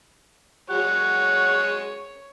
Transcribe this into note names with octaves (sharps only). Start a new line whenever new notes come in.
F#3 G#3 C#5 F#5